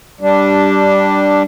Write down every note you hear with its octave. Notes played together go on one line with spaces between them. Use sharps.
G3 D4